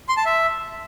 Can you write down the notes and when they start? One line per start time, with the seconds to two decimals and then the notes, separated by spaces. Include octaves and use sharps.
0.09 C6
0.17 A5
0.25 E5